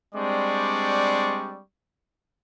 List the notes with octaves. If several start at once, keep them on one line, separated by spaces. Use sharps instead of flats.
G3 G#3 C4 D4 D5 C#6